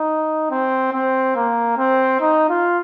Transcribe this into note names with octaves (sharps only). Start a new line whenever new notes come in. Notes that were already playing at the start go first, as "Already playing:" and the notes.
Already playing: D#4
C4
C4
A#3
C4
D#4
F4